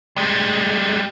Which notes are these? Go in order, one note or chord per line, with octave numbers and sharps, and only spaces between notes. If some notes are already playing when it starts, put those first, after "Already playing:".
G3 G#3